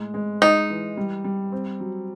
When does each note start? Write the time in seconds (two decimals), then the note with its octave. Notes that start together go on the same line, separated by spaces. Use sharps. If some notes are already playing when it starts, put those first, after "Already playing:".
Already playing: A2 G#3
0.14 G#3
0.42 G#3 D#4
0.69 E3
0.97 G3
1.24 G3
1.52 C4
1.80 F#3